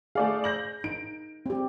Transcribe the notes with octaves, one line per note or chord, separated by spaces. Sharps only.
A3 G#4 D5 F5
G6 A#6 F#7
D#4 D7
C4 G4